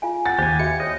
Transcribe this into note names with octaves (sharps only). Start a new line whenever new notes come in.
F4 F5 G#5
F#5 G5 A6
D#2 G4 C5 G#5
F#4 E5 F5 C#7
C5 C#5 D#5